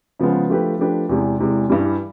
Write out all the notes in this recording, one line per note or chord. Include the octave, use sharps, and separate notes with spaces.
C#3 F3 G#3 B3
F3 A3 D4 G4 B4
F3 A3 D4 G4 B4
E2 C3 E3 G#3
E2 C3 E3 G#3
G2 E3 G3